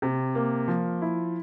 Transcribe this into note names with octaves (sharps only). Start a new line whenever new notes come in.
C3
A#3
F3
E4